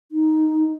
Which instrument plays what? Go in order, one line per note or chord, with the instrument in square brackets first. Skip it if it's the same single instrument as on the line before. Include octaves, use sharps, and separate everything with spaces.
[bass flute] D#4